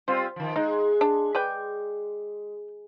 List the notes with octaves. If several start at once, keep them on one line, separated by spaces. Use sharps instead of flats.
G3 C4 F4 C5
D#3 F3
G#3 D#4
D4
B4 D5 G5